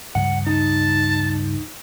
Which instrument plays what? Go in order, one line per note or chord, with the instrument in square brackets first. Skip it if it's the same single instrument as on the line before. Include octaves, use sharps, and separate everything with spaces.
[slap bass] C#2 G2 E3 [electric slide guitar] F#5
[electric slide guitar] D#4 [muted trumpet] A5